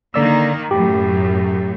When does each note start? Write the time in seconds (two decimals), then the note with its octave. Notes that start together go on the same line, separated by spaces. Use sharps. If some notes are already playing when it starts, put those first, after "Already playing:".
0.14 D3 D#3 A#3 D5 E6
0.71 F#2 A2 G4